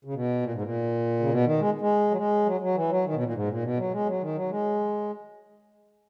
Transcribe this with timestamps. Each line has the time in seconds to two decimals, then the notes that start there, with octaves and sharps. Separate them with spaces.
0.05 C#3
0.14 B2
0.42 A#2
0.53 G#2
0.61 A#2
1.20 C#3
1.30 B2
1.45 D#3
1.59 G#3
1.81 G#3
2.11 F#3
2.17 G#3
2.46 F#3
2.61 F#3
2.75 E3
2.90 F#3
3.05 D#3
3.14 B2
3.23 A#2
3.34 G#2
3.48 A#2
3.63 B2
3.77 F#3
3.92 G#3
4.07 F#3
4.21 D#3
4.35 F#3
4.50 G#3